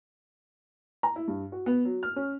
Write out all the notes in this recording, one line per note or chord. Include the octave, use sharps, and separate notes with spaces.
A#5
E4
G2
F#4
B3
F#3
F6
C#4